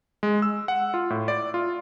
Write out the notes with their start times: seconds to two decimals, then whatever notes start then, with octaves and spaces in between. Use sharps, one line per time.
0.23 G#3
0.42 E6
0.68 F#5
0.94 F4
1.10 A2
1.28 D5
1.54 F4